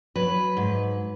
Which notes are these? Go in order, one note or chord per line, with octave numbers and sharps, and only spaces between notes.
F#3 B4
G#2